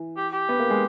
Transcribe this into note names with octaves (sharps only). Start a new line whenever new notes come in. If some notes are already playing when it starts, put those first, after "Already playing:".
Already playing: E3
G4
G4
B3
A#3
G#3